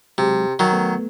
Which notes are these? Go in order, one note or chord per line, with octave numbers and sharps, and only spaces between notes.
C3 F#3 G#3
D#3 F#3
A3 B3